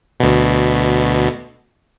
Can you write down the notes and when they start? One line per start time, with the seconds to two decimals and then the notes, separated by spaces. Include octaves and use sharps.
0.20 D2 B2